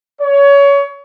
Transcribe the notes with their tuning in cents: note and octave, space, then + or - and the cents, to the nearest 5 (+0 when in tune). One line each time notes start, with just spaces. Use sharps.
C#5 +25